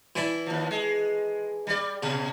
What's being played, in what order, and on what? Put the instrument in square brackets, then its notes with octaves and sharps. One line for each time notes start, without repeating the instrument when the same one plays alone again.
[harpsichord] E3 D4 E4
[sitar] D#2 F3
G#3
G3 D5
[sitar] A#2 [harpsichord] C#3